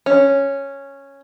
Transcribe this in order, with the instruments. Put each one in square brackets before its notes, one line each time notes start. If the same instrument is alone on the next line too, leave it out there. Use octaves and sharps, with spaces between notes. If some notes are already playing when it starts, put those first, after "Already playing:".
[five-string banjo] C#4